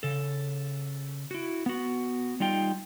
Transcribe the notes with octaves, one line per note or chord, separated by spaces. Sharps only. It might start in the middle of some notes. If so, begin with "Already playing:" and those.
C#3 A4
E4 F#4
B3 F#4
G3 D#4 F4 G5